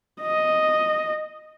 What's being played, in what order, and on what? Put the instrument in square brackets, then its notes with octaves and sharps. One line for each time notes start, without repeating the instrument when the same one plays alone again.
[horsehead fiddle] D#5